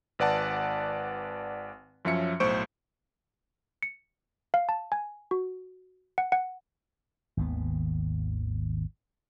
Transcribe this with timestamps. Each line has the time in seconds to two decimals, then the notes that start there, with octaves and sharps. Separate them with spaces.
0.19 G#1 B4 D5 F#5 A5
2.05 F#2 F3 C#4 E5 C#7
2.40 B1 A2 C5 C#6 D7
3.83 C#7
4.54 F5
4.69 A5
4.92 G#5
5.31 F#4
6.18 F#5
6.32 F#5
7.37 G#1 D#2 B3